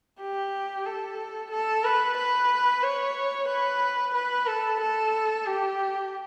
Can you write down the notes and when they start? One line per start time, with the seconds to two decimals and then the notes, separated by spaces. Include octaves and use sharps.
0.20 G4
0.85 A4
1.51 A4
1.84 B4
2.17 B4
2.83 C#5
3.49 B4
4.14 B4
4.47 A4
4.80 A4
5.46 G4